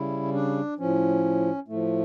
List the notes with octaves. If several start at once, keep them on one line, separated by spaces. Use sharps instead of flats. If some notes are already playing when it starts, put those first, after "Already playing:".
Already playing: C#3 G3 E4
D4
A2 F3 C#4
A2 F3 A3